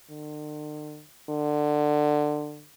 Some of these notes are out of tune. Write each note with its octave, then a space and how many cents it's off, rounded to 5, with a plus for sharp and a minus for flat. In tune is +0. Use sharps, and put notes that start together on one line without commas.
D3 +45
D3 +20